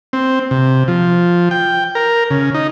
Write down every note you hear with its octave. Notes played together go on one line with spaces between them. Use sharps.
C4
C3
F3
G5
A#4
C#3
D#4